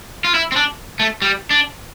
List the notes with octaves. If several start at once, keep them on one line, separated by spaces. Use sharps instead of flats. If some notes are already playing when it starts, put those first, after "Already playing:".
F4
E4
C4
D4
A3
G3
D4